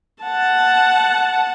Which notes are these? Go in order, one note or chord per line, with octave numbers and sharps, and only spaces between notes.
F#5 A5